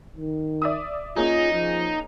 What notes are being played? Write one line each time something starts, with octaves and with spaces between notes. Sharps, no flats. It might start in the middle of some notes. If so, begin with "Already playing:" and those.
D#3
D5 E5 D#6
A#3 C#4 D#4 F4 G#4
F3